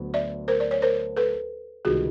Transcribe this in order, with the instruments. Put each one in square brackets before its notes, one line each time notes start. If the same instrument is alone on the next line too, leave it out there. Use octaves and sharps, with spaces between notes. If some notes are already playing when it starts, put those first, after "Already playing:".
Already playing: [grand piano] D2 D3 F#3 B3
[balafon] D5 E5
A#4 C5
D5
C#5
A#4 C5
A4 B4
[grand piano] C#2 C3 D#3 G3 [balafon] F#4 G#4